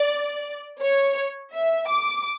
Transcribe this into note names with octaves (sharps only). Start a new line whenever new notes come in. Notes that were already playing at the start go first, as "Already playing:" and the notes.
Already playing: D5
C#5
E5
D6